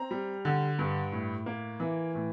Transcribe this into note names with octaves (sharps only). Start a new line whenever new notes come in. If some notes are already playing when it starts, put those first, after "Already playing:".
Already playing: C4 A#5
G3
D3
G2
A2
A#3
E3
A2